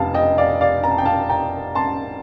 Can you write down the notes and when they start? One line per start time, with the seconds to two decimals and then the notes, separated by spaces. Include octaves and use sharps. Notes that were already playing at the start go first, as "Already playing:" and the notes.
Already playing: F1 C3 F5 A5
0.14 D#5 G5
0.38 D5 F5
0.61 D5 F5
0.84 A#5
0.91 A5
0.98 G5
1.05 F5 A5
1.29 G5 A#5
1.75 A5 C6